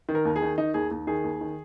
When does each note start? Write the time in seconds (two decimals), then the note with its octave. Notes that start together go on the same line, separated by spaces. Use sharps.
0.09 D#3
0.15 A#4
0.25 D#2
0.36 G#4
0.42 D#3
0.58 D#3 D#4
0.74 D#2 G#4
0.91 D#2
1.07 D#3 G#4
1.24 D#2
1.41 D#3